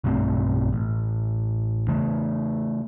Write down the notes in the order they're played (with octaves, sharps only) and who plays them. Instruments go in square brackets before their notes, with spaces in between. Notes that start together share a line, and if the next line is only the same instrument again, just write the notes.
[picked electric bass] B1 G2 A3 C4
A1
C#3 E3 A3